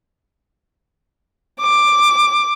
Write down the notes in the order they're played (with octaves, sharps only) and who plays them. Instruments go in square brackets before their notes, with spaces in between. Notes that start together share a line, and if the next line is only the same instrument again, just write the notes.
[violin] D6